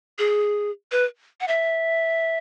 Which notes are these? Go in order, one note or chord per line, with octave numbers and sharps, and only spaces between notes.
G#4
B4
F#5
E5